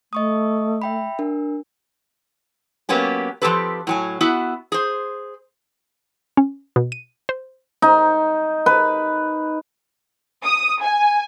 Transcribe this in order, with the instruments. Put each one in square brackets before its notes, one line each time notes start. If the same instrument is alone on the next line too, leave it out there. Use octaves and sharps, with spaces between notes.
[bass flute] A3 [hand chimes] D#5 C#6 D#6
[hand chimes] E5 G5 B5
D4 A#4
[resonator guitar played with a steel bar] F#3 A#3 B3 C#4 G4
F3 F#3 C4 G4 A4 B4
A2 F#3 G#5
B3 E4 F#4
G#4 C5
[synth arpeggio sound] C#4
B2
D#7
C5
[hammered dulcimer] D#4
B4
[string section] D#6
G#5